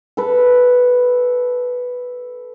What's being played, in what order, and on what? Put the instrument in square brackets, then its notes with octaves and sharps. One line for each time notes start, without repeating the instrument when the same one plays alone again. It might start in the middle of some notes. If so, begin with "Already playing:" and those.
[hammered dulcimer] A4 B4